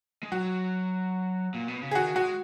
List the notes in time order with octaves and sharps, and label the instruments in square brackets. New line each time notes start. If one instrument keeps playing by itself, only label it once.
[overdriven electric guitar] G#3
[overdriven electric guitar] F#3 [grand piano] F#4
[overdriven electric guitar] A#2
B2
C#3
[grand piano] G#4
[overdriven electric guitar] D#3 [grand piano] F#4
[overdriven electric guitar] G#3 [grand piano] F#4